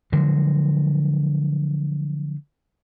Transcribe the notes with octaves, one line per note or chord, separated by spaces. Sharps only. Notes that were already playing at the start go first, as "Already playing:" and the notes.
D3 F3 F#3 G#3